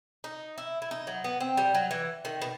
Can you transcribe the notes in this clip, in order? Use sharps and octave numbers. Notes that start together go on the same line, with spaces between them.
D#4
E4
E4
D#4
F#3
B3
C4
G3
F#3
E3
D#3
B2